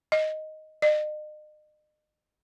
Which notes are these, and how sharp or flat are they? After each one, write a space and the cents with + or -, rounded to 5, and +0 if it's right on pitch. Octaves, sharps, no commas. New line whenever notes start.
D#5 +0
D#5 -40